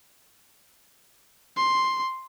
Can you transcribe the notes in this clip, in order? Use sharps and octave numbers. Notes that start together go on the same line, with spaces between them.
C6